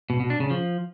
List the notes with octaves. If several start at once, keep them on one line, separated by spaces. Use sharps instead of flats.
B2
B2
D4
C#3
F3